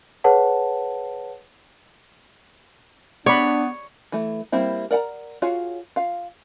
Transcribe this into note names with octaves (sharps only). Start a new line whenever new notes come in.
G#4 B4 C#5 F#5 A5
B3 D4 C#5 D5 B5
E3 A3
G3 A#3 C4 E4
A#4 D5 F#5 G5 A#5
F4 F#4 G#4 C#5 F5
F4 F5